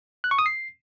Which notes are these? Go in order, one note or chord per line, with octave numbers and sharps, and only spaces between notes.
F#6
C#6
D#6
C7